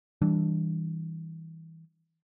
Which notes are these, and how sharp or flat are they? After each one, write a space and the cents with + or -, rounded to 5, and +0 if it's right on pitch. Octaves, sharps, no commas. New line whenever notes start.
E3 -25 G3 +0 D4 +0